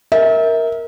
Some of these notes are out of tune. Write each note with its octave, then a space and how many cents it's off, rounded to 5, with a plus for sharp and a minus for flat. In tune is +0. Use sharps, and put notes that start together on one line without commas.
A#4 +0 E5 -30